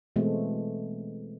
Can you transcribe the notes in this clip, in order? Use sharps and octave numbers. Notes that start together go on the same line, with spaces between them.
B2 E3 G#3 A3 C4